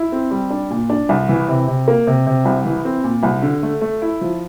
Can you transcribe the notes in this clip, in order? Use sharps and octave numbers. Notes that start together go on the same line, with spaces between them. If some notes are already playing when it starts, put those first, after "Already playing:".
Already playing: E4
C4
G3
D4
A#2
D4
C2
E3
C3
C3
A#3
C3
C3
C2
E3
C4
A#2
C2
D3
A3
A3
E4
F3